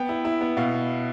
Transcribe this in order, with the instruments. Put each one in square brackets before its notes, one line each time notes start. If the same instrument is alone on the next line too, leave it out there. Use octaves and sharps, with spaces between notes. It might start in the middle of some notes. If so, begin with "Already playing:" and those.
Already playing: [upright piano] B3 G5
E4
E4
B3
B2 F5